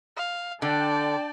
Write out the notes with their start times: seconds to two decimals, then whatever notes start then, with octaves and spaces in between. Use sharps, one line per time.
0.16 F5
0.62 D3 D5 G5 A5